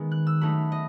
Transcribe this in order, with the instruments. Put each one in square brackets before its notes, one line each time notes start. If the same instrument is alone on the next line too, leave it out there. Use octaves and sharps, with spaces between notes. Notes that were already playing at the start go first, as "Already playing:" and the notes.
Already playing: [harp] D#3 G#3 B3
F#6
E6
F#3 A3 D#4 B5
D#5